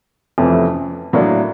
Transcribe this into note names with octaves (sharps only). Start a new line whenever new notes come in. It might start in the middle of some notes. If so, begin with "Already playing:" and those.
F2 C3 E3 A3 C#4
A2 F#3 A#3 D4